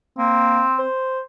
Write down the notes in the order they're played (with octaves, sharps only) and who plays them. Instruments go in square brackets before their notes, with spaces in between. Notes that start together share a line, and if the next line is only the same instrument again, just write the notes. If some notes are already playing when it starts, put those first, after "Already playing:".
[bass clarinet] A#3 [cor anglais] C4
[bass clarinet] C5